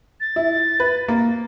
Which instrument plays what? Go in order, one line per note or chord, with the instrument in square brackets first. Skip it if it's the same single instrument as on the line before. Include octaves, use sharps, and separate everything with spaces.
[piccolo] A6
[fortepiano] E4
B4
A#3